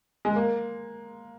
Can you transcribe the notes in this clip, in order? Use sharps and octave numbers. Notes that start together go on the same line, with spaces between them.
G#3
A#3